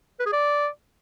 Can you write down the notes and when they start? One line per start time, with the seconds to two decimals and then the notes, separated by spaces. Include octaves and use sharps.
0.20 B4
0.26 G#4
0.33 D5